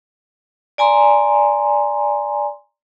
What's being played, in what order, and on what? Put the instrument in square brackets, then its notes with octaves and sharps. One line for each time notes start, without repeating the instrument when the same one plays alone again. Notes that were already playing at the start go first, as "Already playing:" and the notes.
[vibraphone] D5 G#5 A#5 C6